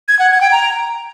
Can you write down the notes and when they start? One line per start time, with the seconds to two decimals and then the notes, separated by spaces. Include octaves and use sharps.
0.08 G#6
0.19 F#5
0.30 G#6
0.41 G5
0.52 A#5